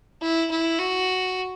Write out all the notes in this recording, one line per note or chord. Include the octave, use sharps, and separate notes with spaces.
E4
E4
F#4